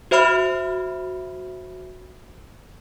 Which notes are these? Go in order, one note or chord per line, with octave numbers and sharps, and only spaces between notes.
F#4 C5 E5 B5 F6